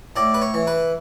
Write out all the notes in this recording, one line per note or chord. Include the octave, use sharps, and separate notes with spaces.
A2 D5
B4
C#5
E3
B4